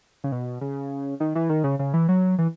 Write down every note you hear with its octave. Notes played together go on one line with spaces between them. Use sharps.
C#3
B2
C#3
D#3
E3
D#3
C#3
C#3
E3
F#3
E3